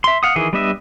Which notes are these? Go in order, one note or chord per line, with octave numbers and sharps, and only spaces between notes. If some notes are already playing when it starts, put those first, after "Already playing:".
E5 C6
F5 F#5 D#6
D#3 E3 G#4
G3 B3 D4 D#5 E5